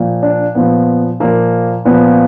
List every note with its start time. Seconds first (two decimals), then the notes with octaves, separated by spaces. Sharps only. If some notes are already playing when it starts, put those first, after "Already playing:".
Already playing: A#2 F3
0.23 D4
0.55 A#2 F3 B3
1.20 A#2 F3 A#3
1.85 A#2 F3 B3